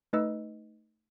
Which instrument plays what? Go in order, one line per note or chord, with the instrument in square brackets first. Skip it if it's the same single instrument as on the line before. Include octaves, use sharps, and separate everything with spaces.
[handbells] A3 D#4 B4 D#5 E6